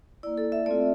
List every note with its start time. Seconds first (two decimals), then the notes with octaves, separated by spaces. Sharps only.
0.23 A#3 E4 D5
0.38 A4
0.52 E5
0.66 A3 C4 F4 D5